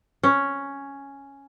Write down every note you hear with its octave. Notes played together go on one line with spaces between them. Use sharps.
C#4